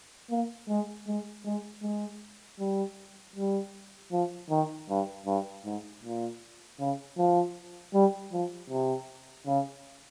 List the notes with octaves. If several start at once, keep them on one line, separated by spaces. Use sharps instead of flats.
A#3
G#3
G#3
G#3
G#3
G3
G3
F3
D#3
G2
G2
G#2
A#2
C#3
F3
G3
F3
C3
C#3